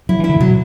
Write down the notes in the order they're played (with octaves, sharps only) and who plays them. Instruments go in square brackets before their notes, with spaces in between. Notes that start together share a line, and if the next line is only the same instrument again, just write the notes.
[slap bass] F#3 [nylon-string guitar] E4
[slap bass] E3
[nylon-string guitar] E4
[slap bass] D3
A2
[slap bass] B2 [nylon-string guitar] F#3